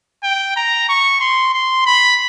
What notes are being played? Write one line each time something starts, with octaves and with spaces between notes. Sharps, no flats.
G5
A#5
C#6
C6
C6
B5